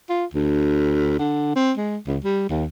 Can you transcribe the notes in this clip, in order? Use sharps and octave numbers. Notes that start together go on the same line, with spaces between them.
F4
D2
D3
C4
G#3
C#2
G3
D#2